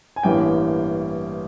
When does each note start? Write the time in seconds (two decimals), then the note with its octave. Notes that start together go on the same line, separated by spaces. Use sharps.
0.16 G#5
0.23 A1 G2 E3 G3 A#3 G5